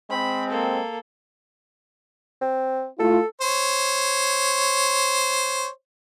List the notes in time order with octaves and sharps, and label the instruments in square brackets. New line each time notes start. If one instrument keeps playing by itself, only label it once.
[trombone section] G#3 C4 [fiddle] B5
[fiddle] A#3 A4
[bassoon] C4
[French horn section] A3 E4 F4 [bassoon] A4
[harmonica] C5 C#5